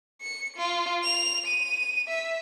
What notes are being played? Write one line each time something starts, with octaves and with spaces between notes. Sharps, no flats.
C#7
F4
F7
D#7
E5